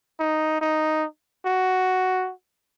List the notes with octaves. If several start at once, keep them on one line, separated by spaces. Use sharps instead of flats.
D#4
D#4
F#4